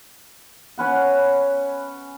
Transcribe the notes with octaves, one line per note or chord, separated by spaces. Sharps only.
C#4 B4 F#5